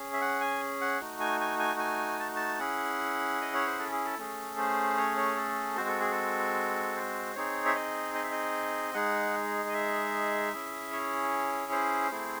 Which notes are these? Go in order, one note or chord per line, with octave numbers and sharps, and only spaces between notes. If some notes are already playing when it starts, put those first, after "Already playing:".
Already playing: C#4 G#4
E5
F#5
G#5
F#5
A3 D#4 F#4
G#5
G#5
G#5
G#5
A5
A5
C#4 E4 G#4 F#5
D#5
C#5
C5
A4
G#4
A4
A3 C#4 G#4
C5
C#5
C#5
A4
G#3 C4 F#4 C5
A4
G#4
A4
C5
C4 D#4 G#4 C#5
E5
D#5
D#5
E5
D#5
G#3 D#4 G#4 F#5
D#5
E5
C#4 E4 G#4
C#5
C5
A3 C4 E4 G#4